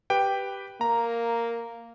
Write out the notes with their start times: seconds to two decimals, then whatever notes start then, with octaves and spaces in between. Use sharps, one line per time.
0.10 G4 B4 G5
0.81 A#3 A#5